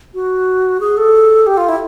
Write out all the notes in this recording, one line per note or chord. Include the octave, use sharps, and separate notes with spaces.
F#4
G#4
A4
G4
F4
E4